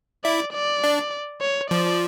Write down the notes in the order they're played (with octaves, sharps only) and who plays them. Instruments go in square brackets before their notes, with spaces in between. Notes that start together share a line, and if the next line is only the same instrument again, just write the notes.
[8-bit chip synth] E4 [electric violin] D5
[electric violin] D5
[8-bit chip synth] D4
[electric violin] C#5
[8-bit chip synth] F3 [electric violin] D5